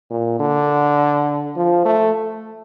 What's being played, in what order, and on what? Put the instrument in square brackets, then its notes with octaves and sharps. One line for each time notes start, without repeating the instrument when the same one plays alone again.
[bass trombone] A#2
D3
F3
A3